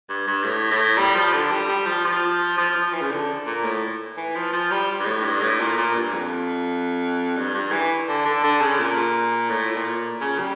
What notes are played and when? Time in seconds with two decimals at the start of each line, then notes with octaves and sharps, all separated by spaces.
0.09 G2
0.27 G2
0.44 A2
0.71 A2
0.98 G3
1.16 F3
1.33 D3
1.52 G3
1.68 G3
1.86 F3
2.05 F3
2.58 F3
2.76 F3
2.93 E3
3.02 C#3
3.12 D3
3.46 A#2
3.64 A2
4.17 E3
4.35 F3
4.53 F3
4.71 G3
5.00 G2
5.06 A2
5.24 G2
5.42 A2
5.60 A#2
5.77 A#2
5.95 G2
6.13 F2
7.37 G2
7.54 G2
7.73 E3
8.09 D3
8.25 D3
8.44 D3
8.61 C#3
8.79 A#2
9.50 A2
9.77 A#2
10.21 C#3
10.39 G3